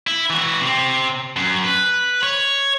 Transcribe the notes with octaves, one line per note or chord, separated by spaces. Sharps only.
E4
E3 F#4
C3 C4
F#2
B4
C#5